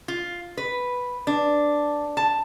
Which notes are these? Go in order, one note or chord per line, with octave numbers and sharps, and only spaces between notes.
F4
B4
D4
A5